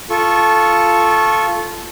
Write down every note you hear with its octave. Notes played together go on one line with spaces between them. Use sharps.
F4 A4 C#6